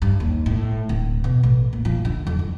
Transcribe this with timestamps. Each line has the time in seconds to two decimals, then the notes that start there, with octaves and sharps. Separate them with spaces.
0.02 G2
0.20 D#2
0.46 A2
0.89 D1
1.24 B2
1.43 A1
1.73 A#2
1.85 F3
2.05 D3
2.27 F2
2.39 E2